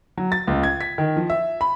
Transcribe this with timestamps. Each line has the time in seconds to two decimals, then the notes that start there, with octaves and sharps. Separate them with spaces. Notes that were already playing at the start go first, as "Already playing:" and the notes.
0.17 F#3
0.32 A6
0.47 C#2
0.63 G#6
0.81 B6
0.98 D#3
1.17 F3
1.30 E5
1.61 B5